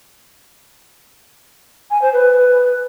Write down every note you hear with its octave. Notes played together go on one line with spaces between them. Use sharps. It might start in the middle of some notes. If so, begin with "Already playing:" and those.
G#5
C5
B4